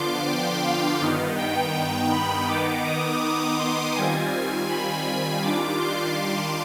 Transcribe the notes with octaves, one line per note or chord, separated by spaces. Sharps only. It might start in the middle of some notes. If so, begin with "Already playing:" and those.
Already playing: D3 F3 B3 D4 F4 C6 D6
G5
F5
G2 D#3 B3 D#4
G5
B5
D#3 B3 D#4 D6
D#6
D6
C6
D#3 G3 C4 F4 G#5
B5
D#3 G3 D4 F4 D6
C6